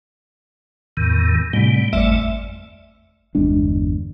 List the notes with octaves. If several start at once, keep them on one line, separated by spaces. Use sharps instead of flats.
E2 A2 D#3
A2 C3 G3
G#1 F2 A3 D5 E5
G1 E2 G#3 D4